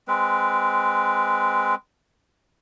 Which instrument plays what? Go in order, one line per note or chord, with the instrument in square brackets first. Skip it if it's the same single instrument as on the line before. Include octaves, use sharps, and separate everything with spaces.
[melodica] G#3 C4 B4